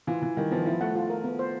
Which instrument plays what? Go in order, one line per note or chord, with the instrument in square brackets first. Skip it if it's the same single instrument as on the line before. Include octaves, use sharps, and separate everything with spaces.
[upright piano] E3 [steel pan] F4
[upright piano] E3 [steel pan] F4
[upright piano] D#3 [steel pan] G3
[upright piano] F3 [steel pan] B3
[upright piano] F3 [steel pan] E4
[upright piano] A3 [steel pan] F#5
[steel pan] F4
A#4
B3
C5